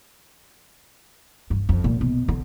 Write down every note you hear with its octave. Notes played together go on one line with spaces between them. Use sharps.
G2
F2
A#2
B2
D3